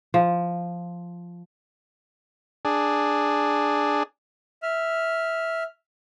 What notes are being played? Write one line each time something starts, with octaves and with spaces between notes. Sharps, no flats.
F3
D4 G#4
E5 F6